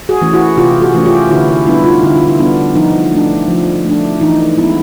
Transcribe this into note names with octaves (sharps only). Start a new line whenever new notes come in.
F#4 G#4
E3 A3 C#4
E4 F#4
C3 F4 G4
F#4 G#4
E3 A3 C#4
F4 G4
D3 E4 F#4
E4
G3 B3 D4 E4
D#4 F4
D3 E4
F4
E4
G3 B3 D4
F3 D#4
A3 D4
F3
A3 D4
E3 D#4
G#3 B3 E4